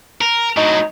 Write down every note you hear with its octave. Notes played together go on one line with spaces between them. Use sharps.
A#4
A2 F#3 D#4